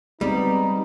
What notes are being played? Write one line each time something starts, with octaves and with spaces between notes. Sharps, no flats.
G3 G#3 B3 C4 D#4